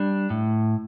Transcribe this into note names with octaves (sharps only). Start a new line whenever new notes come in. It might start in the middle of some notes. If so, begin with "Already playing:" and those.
Already playing: G3 D4
A2